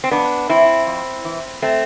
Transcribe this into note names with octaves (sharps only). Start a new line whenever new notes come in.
C4
F2 B3 D4
E3 C4 E4
F2
E3
A3 C4